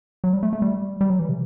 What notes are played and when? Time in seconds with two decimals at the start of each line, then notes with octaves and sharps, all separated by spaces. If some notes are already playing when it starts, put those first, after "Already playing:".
0.24 F#3
0.33 G3
0.43 A3
0.53 A3
0.62 G3
1.01 G3
1.10 F#3
1.19 E3
1.29 C3